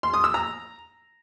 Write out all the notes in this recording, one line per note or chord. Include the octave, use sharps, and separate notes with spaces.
C6
D#6
E6
A#5